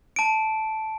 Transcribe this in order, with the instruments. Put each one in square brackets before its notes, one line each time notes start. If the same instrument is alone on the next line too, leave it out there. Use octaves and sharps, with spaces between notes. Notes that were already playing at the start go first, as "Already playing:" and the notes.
[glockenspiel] A5 D7